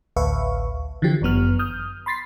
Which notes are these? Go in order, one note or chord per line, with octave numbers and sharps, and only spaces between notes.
A1 D2 B4 E5 F5 C#6
D3 E3 F3 G4
G1 F#2 B3 F6
D#6 F6 G6
B5 C6 A6 B6 C7